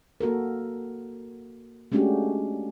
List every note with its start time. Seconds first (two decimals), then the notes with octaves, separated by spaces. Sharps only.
0.21 A#3 F#4 A4 A#4
1.92 G#3 A3 C#4 D4 F#4 G4